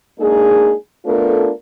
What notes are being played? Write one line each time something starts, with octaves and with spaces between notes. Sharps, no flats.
G#3 A#3 D4 D#4 G#4
A3 B3 D4 F4 A4 A#4